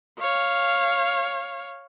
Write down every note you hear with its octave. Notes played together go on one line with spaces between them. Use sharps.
C#5 F5